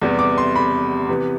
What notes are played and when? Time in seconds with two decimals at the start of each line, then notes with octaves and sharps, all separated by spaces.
0.01 E2 C3 G3 B3
0.19 D6
0.38 C6
0.56 B5
1.09 C3 E3 B3